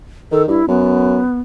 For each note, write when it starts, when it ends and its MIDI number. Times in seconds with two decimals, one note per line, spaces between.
0.32 0.47 51
0.32 0.42 69
0.48 0.61 43
0.48 0.66 64
0.69 1.20 42
0.69 1.39 59